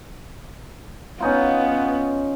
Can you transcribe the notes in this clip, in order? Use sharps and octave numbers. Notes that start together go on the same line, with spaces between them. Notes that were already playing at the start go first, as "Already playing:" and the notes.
B3 C#4 D#4 F4